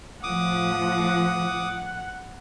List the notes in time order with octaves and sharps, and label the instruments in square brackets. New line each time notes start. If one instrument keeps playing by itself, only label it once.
[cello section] A2 F3 [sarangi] F#5 [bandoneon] D6 D#6